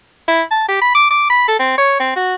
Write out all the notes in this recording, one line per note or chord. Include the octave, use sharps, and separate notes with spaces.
E4
A5
G4
B5
D6
D6
B5
A4
C4
C#5
C4
F#4